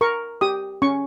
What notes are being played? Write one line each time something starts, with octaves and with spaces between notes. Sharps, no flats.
A#4 C#6
G4 D#6
C#4 C#6